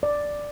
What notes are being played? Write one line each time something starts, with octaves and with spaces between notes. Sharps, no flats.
D5